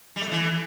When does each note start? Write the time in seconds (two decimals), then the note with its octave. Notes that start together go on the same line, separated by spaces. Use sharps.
0.16 G3
0.21 A3
0.26 B2
0.32 E3